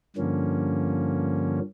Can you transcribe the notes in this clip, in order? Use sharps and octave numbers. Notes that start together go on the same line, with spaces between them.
G2 D3 F3 A#3 C#4